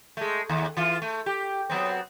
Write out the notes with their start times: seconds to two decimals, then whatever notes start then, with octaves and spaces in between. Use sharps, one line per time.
0.17 G#3 A3
0.49 D#2
0.77 E3 F4
1.02 A3
1.26 G4
1.70 F#3 B3 C4